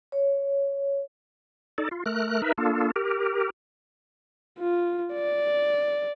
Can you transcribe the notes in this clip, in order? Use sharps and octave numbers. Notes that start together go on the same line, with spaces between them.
C#5
D#4 A4 D5
F4
A3 A#4 F#6
D#4 A#4 B4 E5
A#3 D4 F4 A4
G4 A#4
F4
D5